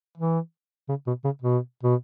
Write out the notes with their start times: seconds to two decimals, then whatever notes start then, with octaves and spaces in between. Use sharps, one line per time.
0.18 E3
0.89 C#3
1.07 B2
1.24 C#3
1.42 B2
1.83 B2